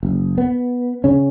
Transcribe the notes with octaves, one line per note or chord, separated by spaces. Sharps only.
F#1
B3
C#3 C#4